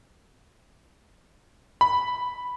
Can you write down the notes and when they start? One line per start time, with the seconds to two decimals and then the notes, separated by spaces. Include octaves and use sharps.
1.81 B5